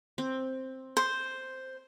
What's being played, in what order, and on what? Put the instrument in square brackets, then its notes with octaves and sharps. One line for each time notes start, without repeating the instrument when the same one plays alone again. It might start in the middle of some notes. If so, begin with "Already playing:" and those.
[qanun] C4
[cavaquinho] C5